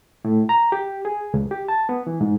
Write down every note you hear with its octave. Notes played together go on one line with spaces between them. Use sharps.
A2
A#5
G4
G#4
C#2
G4
A5
B3
E3
G#2